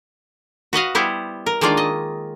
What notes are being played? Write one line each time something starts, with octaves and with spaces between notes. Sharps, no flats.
F#4 B4 D#5 F5
G3 B3 E4 G4 C5
A#4
D#3 G#3 A#3 D4 F4 D5
D#5